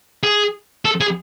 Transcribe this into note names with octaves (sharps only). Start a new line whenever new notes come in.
G#4
A4
G#4